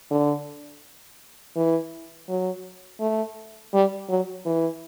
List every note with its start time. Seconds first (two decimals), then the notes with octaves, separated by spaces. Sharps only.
0.11 D3
1.56 E3
2.29 F#3
3.00 A3
3.74 G3
4.09 F#3
4.46 E3